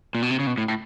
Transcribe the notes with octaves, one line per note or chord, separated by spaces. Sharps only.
A#2
B2
C3
C#3
B2
A2
A2